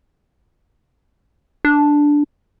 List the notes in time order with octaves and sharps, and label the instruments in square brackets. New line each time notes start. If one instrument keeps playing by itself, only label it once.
[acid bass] D4